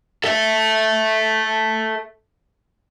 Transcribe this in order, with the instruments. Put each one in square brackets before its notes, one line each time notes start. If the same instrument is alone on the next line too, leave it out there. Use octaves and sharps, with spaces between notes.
[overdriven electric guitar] A4 E5